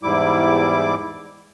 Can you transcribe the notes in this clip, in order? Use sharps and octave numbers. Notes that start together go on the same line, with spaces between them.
E2 G#2 G3 E4 D6